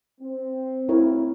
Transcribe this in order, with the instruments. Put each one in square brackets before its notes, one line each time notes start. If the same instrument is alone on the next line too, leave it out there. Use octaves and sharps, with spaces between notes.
[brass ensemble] C4
[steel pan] E4 A#4 C#5